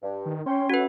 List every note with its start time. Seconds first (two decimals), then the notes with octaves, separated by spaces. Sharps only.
0.02 G2
0.26 D#3
0.46 C#4 C#5 G5 C6
0.70 A3 F#4 B4 F#5